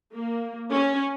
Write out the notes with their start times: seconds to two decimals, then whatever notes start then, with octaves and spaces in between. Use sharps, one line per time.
0.14 A#3
0.72 C#4